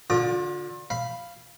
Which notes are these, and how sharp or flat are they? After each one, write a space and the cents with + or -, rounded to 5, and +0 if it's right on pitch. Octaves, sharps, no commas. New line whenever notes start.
D3 +0 F4 +35 D6 +30
F5 -10 B5 +0